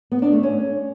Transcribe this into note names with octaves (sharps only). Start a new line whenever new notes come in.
B3
D4
A3
C#4